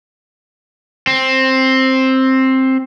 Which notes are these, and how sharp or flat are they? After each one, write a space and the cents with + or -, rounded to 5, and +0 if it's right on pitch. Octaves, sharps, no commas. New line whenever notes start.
C4 +10